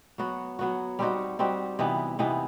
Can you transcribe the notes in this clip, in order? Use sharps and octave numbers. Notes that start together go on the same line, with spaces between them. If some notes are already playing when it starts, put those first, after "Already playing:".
F#3 B3 F#4
F#3 B3 F#4
G3 C4 D#4 F#4
G3 C4 D#4 F#4
C3 E3 B3 D#4
C3 E3 B3 D#4